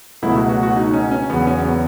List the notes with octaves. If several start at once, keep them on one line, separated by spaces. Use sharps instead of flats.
C#2 B2 F#3 A3 E4
F#4
F#4
F#4
D#4
C#4
C#4
E2 C#3 F#3 B3
C#4
B3